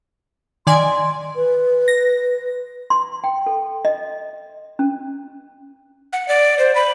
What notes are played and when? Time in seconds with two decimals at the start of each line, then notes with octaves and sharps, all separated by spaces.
0.67 D#3 D5 G#5 C6
1.36 B4
1.88 A#6
2.90 C6
3.24 G5
3.46 A4
3.85 D#5
4.79 C#4
6.13 F#5
6.28 D5
6.59 C5
6.75 B5